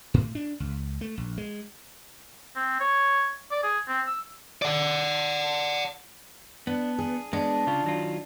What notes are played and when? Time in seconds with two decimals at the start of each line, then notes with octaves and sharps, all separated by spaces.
0.14 A2
0.35 D4
0.60 C#2
1.01 A3
1.17 A#1
1.38 G#3
2.56 C4
2.80 C#5
3.51 D5
3.63 G#4
3.88 C4
4.07 E6
4.62 D5 F#5
6.67 B3 D4
6.99 G#4
7.33 G#3 B3 D4
7.67 C#3 F4
7.84 D#3 F#3 F4